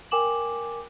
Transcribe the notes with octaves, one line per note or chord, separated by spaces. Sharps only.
A#4 G5 G#5 D6 E7 F#7